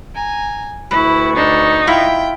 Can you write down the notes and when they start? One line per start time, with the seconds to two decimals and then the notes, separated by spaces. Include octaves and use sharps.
0.13 G#5 A#5
0.91 D2 E4 B4 C#6
1.36 D4 D#4
1.87 E4 F4 E5 G5